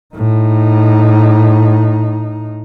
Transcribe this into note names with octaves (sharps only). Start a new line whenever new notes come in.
A2 D#4